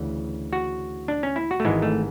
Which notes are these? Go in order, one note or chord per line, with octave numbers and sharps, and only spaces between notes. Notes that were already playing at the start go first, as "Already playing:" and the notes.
Already playing: D2 C#3 E3
F#4
D4
C#4
E4
F#4
A3
G#1 G#2 E3 G#3
A3